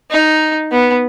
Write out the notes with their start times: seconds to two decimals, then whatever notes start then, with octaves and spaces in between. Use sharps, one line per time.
0.10 D#4
0.71 B3